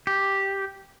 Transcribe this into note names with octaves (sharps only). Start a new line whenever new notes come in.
G4